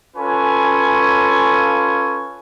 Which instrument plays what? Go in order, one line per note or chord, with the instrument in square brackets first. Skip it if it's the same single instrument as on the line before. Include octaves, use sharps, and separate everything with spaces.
[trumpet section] C#4 F4 A4 B4 C#5 G#5